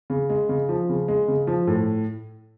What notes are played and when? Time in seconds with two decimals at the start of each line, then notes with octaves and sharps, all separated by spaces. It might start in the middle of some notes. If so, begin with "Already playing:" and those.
0.10 C#3
0.30 G#3
0.49 C#3
0.69 F3
0.89 C#3
1.08 G#3
1.28 C#3
1.47 F3
1.67 A2